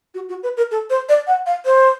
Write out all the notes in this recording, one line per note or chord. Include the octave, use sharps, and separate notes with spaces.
F#4
F#4
B4
A#4
A4
C5
D5
F#5
F5
C5